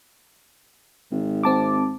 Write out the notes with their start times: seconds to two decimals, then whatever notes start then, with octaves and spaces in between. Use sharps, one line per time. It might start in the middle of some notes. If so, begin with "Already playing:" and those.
1.11 G#1
1.43 C4 A5 D6